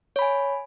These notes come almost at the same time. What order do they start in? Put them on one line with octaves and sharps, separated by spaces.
C#5 B5 G#5